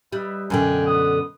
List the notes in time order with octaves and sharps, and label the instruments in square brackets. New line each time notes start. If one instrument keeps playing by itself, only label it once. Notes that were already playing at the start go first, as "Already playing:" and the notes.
[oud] G3 [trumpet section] B4 D#5 E5
[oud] F#2 B2 D3 [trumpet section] G5 G#5
[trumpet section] B3 D#6